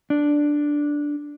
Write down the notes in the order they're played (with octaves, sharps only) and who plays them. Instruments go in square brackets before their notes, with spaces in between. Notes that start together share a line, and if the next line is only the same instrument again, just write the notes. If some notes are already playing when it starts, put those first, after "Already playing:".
[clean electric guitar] D4